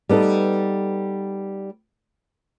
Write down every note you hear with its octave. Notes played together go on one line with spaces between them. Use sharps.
G3 B3 D#4 A4